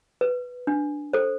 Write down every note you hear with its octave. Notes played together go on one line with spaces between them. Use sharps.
B4
D4
A4 C5